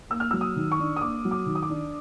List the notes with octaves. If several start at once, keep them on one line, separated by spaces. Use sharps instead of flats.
A#3 E6
F6
F#3 E6
D#6
D#3
C#6
D4
D#6
A#3 D6
F#3
D6
D#3
D#6
D6
D4